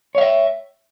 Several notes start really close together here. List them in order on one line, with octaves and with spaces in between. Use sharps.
C#5 F5 E5